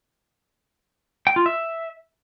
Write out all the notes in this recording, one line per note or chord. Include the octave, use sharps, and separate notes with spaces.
G5
F4
E5